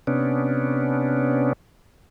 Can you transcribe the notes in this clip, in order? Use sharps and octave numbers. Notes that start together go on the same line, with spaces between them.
C3 B3 C#4 D4